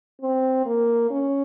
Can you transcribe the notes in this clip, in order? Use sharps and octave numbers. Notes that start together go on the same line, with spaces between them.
C4
A#3
C#4